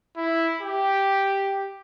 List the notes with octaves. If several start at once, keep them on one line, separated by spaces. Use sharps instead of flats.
E4
G4